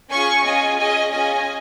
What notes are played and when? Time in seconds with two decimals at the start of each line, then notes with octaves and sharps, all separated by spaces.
0.10 C#4 F4 G#4 G#5 C#6
0.44 C#4 F4 G#4 D#5 G#5
0.78 C#4 G#4 D#5 G#5
1.12 C#4 F4 G#4 D#5 G#5